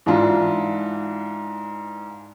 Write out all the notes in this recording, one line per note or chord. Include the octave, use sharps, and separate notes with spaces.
G#2 E3 D4 F4